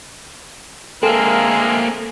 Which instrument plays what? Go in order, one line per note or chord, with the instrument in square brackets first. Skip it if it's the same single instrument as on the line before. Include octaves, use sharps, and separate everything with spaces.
[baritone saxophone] G#3 [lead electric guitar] A#3 C4 [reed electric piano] A4 [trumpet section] A#4 E5 F5